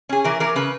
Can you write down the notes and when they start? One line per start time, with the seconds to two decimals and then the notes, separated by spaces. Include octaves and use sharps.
0.09 C#4 G#4
0.24 E3 A#4
0.40 E3 A#4
0.56 C#3 B4